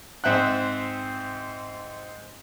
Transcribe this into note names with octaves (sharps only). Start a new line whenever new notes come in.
G#2 C4 E5 G5 F#6